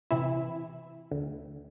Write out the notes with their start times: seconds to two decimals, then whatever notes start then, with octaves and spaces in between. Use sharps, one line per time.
0.11 C3 E3 E4
1.11 D2